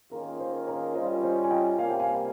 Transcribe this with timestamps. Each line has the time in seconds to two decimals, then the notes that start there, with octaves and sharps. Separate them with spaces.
0.11 D#3 A#3 C#4 F4 G#4 A#4
0.40 C5
0.67 A#4 C#5
0.95 G3 C#4 F4 C5 D#5
1.23 C5 D#5
1.44 G#5
1.51 D#5 G5
1.78 C3 G3 A#3 F5 G#5
1.90 G5
2.00 F5 G#5